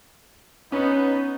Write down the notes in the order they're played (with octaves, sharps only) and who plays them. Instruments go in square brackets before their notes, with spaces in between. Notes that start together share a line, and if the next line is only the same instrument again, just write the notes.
[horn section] B3 D#4 [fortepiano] C#4